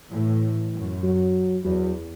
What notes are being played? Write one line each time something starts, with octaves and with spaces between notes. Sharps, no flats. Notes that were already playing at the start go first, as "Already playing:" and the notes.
A2 E3
F#2
F#3
E2 F#3